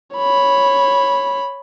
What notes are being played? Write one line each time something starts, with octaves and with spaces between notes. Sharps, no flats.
C#5 B5